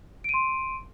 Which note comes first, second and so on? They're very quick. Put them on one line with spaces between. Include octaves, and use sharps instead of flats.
D7 D#7 C6